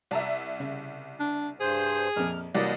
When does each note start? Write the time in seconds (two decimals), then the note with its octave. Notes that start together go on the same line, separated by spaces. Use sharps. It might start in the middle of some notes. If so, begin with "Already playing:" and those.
0.11 C2 D5 E5 A5 A#5
0.60 C#3
1.20 D4
1.60 G2 G#4 C5
2.16 A#1 F2 F6
2.55 C2 E3 F#3 G3 A#3 D5 D#5